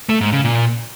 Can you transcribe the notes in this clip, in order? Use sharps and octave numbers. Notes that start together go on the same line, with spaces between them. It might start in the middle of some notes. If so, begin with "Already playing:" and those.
A3
G#2
C#3
A#2